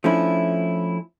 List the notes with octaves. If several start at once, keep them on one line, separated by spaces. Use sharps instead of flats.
F3 A3 C#4 D4 E4